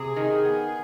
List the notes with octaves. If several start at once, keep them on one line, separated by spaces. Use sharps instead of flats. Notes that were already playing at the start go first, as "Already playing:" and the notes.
Already playing: C3 G#4
D#3
B3